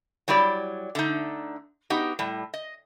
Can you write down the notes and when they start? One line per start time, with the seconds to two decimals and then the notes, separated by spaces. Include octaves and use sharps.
0.28 F#3 G3 E4 G4 D5
0.95 D3 A3 D#4
1.90 B3 D#4 F#4 G4
2.19 A2 G3
2.54 D#5